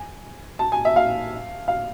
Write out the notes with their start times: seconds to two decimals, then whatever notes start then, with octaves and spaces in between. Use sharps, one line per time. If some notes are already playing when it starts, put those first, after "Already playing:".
Already playing: G#5
0.59 A5
0.72 G#5
0.85 E5
0.96 F5
1.68 F5